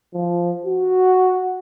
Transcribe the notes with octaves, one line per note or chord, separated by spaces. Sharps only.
F3
F#4